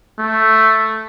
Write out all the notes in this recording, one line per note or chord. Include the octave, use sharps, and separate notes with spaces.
A3